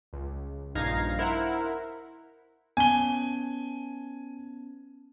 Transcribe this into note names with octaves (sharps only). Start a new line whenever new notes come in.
C#2
A#1 G2 D#4 F5 G#6 A#6
E4 A#4 C5 E5 F#5
B3 C#4 G#5 A5 G7